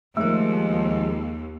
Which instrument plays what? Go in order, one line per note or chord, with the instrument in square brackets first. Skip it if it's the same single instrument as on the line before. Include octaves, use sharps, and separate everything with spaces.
[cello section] D#2 [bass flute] F3 [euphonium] G#3 [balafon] A3 A#4